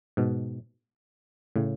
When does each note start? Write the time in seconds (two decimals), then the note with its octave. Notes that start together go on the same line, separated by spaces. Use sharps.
0.17 G#2 B2
1.56 A2 C#3